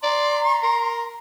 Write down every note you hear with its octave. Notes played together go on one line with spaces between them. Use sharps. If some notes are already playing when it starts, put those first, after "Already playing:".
D5 A#5 C6
A#4